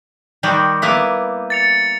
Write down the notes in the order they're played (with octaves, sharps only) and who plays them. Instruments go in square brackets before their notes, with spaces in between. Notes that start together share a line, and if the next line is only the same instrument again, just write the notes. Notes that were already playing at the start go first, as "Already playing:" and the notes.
[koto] D#3 G3 F#4
A#3 B3 E4
[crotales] A6 C#7 F7